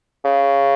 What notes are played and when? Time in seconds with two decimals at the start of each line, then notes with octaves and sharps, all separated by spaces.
0.25 C#3